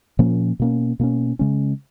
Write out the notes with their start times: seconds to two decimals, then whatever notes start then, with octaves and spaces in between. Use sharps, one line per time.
0.19 A#2 F3 A#3 C#4
0.59 B2 A#3 C#4
0.99 B2 A#3 C#4
1.39 C#3 G#3 C#4